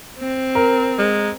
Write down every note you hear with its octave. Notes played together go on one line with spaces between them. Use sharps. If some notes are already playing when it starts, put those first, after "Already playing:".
C4
A#4
G#3